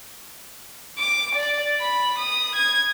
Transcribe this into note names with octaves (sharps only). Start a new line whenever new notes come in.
D6
D5
B5
D#6
G#6